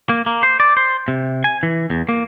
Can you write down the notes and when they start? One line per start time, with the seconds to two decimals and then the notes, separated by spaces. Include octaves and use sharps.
0.09 A#3
0.26 A#3
0.43 C5
0.60 D5
0.77 C5
1.08 C3
1.44 G#5
1.63 E3
1.90 E2
2.09 A#3